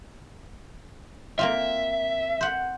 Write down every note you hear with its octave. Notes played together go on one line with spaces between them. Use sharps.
A#3 C4 F4 E5
C5 F#5